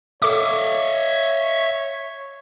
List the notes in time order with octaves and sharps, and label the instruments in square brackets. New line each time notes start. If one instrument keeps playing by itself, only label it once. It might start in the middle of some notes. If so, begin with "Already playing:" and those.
[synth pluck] A4 D6 [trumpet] C#5 [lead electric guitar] E5 F5